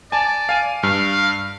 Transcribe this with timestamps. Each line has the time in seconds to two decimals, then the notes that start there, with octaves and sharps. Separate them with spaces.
0.12 D5 G#5 A5
0.49 F5 G#5 D#7
0.83 G2 F5